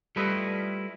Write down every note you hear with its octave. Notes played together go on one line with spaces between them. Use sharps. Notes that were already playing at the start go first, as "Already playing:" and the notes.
G3 A3 E4 F4 B4 D#5